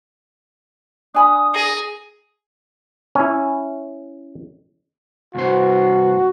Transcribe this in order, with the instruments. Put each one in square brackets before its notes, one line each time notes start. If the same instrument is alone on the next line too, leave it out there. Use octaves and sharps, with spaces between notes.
[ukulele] D4 G#5 B5 [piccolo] D#6
[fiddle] G#4 [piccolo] A#6
[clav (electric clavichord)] C#4 E4
[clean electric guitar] C2 G2 C5 [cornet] F#4